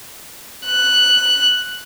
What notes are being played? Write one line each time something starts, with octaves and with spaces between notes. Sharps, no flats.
F#6